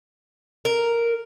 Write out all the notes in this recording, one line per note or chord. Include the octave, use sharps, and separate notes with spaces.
A#4